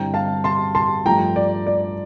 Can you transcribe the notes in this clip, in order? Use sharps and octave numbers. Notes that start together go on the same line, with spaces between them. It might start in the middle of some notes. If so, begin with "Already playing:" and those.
Already playing: G2 D3 G3 C4 E4 G5 A#5
F5 A5
A5 C6
A5 C6
G2 F3 A3 G5 A#5
D5
D5